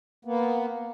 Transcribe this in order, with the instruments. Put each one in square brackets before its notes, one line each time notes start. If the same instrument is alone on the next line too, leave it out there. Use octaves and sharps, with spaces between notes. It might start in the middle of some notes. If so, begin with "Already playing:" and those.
[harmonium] A#3 B3